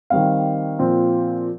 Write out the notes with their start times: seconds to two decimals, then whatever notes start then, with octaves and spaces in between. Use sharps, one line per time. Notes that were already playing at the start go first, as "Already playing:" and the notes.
0.10 D#3 G3 C4 F5
0.79 A#2 F3 C4